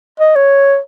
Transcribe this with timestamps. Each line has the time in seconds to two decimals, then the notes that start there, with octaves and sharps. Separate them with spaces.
0.20 D#5
0.36 C#5